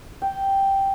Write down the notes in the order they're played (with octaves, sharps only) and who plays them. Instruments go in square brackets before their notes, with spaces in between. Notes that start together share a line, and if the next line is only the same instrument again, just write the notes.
[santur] G5